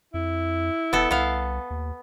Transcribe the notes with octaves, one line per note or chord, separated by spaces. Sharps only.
F2 E4
E1 B3 A4
C2 B3 F5
D#2